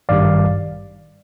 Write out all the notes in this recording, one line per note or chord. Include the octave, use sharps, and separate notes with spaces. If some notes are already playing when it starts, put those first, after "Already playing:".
G#1 G2 D#3 G3 D5 F5